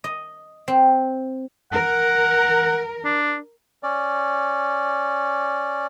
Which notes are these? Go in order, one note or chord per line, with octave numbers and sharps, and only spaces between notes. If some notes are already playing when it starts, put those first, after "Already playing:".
D#5
C4
A#4 F#5
D4
C#4 D5